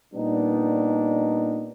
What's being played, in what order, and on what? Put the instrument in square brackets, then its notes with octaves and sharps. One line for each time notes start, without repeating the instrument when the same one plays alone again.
[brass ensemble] A#2 G3 B3 D4 D#4